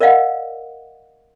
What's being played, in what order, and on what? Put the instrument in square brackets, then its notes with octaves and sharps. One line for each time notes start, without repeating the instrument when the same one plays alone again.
[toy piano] A#4 D5 D#5 F5 F#5